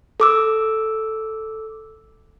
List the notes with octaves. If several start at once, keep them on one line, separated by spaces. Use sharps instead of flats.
A4 D6 E6